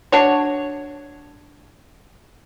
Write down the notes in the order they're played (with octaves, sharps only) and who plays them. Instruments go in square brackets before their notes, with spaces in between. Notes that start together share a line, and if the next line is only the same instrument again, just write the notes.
[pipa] D4 F#4 C#5